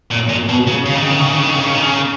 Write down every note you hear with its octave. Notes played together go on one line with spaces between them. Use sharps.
A#2
A#2
B2
C#3
C#3
D#3
C#3
D#3
C#3
D#3
C#3
D#3
C#3
D#3
C#3
D#3
C#3